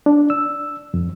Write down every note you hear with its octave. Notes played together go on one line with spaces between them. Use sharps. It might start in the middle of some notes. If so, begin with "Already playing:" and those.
D4
E6
F2